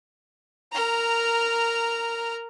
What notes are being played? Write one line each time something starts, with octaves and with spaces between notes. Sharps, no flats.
A#4 A#5